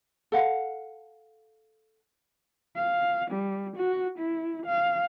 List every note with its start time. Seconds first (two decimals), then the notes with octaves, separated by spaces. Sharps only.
0.32 A4 F5 F#5
2.76 F5
3.31 G3
3.76 F#4
4.18 E4
4.66 F5